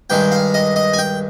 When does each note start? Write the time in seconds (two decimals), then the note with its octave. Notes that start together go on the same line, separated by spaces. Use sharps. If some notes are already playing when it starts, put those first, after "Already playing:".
0.10 G2 D#3 G#3 G5
0.32 F5
0.54 D#5
0.76 D#5
0.93 G#5
0.98 G5